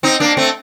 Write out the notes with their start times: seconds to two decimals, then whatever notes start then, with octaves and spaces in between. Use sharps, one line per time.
0.03 C4 D#4
0.20 A#3 D4
0.37 A3 C4